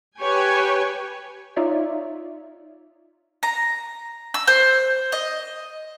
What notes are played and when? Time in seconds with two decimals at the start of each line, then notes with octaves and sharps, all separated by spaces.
0.18 G4 B4 C#5 G5 G#5
1.56 D#4 F4 C#5 D5 E5
3.43 A#5
4.34 E6
4.47 C5
5.12 D#5